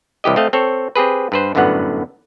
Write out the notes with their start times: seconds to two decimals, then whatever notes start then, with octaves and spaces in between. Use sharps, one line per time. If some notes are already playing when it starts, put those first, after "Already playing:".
0.24 C2 E3 G4 D#5
0.36 A3 C4 D#5 F5
0.53 C4 A4 C#5
0.96 C4 G4 G#4 B4
1.32 G2 B4 C5
1.55 G1 F#2 A2 D3 B3 F#5